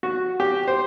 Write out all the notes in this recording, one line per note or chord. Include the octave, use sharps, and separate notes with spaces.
F#4
G4
C5